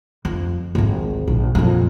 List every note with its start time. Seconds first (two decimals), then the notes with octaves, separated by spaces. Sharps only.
0.25 F2
0.75 G#1 C#2
1.28 A#1
1.55 F2 A#2